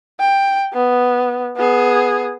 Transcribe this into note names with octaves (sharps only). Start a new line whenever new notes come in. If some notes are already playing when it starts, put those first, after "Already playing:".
G5
B3
B3 G#4